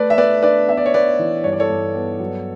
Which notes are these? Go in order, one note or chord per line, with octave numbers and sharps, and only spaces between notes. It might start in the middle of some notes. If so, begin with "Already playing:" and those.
Already playing: A3 B4 D5
E5
A3 B4 D5
D4 B4 D5
B3 E5
D5
C#5
B3 B4 D5
E3
G2 C#5
D5
A4 C#5
G2
B3
F#3